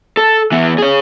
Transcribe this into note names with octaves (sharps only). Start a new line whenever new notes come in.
A4
E3 B3
G#4 C#5